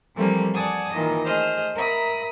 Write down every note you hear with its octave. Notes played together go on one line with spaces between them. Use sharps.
E3 F3 G3 A3 A#3 C4
D5 F#5 G#5 A5 D#6
A#2 D#3 E3 D#5
A3 G#4 C5 D#5 F6
A#4 E5 A#5 B5 D#6